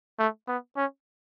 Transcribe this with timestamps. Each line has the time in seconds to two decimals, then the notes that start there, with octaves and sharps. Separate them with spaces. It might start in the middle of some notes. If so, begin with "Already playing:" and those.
0.19 A3
0.48 B3
0.77 C#4